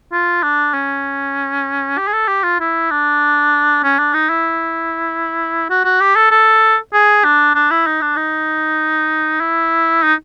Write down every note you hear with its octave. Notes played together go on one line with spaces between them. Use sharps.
F4
D4
C#4
G4
G#4
A4
G4
F4
E4
D4
C#4
D4
D#4
E4
F#4
F#4
G4
A4
A4
G#4
D4
D4
E4
D#4
D4
D#4
E4
D#4